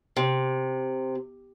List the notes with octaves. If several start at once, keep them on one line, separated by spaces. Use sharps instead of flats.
C3